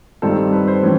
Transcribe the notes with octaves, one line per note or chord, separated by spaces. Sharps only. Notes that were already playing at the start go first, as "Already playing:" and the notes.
G2 D#3 G3 C4 A4
B4
C5
A2 E3 C#4